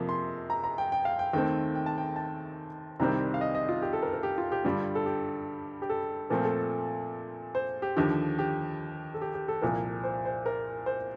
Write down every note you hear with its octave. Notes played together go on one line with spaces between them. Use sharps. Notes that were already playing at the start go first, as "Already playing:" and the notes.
Already playing: F2 C3 F3 A#3
C6
A#5
A#5
G5
G5
F5
G5
D#2 D#3 A3 C4 G5
G5
A5
G5
A5
C2 C3 D#3 G3 C4 A#5
F5
D#5
D#5
F4
G4
A4
A#4
A#4
G4
F4
G4
G2 D3 G3 F4
A4
G4
G4
A4
A#2 F3 A3 C4 A#4
A4
C5
G4
D#2 D3 F3 G4
G4
A4
G4
G4
A4
C2 A#2 F3 A#4
C5
C5
A#4
C5